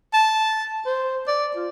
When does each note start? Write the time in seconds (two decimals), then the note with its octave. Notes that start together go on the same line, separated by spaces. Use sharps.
0.13 A5
0.86 C5
1.27 D5
1.56 F4